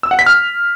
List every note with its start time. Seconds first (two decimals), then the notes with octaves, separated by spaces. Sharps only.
0.03 E6
0.11 F#5
0.19 B6
0.26 F6